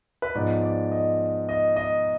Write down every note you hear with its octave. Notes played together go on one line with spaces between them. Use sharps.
B4
G#2 F3 B3 D5
D5
D#5
D#5
D#5